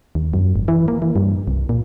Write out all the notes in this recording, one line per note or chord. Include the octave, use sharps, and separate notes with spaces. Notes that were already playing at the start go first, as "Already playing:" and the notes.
D#2
F#2
G#1
E3
A#3
E3
G2
C2
A#2